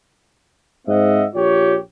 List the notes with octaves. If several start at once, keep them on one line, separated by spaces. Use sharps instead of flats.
G#2 C4 D#5 E5 F#5
A#1 F4 G4 C#5